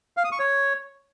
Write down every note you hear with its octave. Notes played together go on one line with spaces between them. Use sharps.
F5
D#6
C#6
C#5